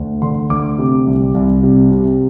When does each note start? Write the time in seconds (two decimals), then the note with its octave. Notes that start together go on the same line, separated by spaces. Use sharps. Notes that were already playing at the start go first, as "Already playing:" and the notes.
Already playing: D2
0.22 D3 C6
0.50 D2 D6
0.78 C3
1.06 C2
1.34 C2
1.63 C3
1.91 C3